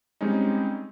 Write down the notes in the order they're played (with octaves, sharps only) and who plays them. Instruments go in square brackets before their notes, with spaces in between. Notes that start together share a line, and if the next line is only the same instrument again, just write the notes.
[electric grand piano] G3 G#3 C4 C#4 D#4